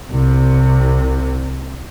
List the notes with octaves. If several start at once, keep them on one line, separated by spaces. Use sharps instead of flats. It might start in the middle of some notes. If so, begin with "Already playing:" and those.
C2 C3